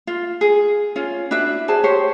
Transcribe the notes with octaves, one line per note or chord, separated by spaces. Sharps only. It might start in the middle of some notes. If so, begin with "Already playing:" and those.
F4
G#4
C#4 F4
D4 E4 F#4 E5
F#4 G#4 C5 A5
G4 C5 C#5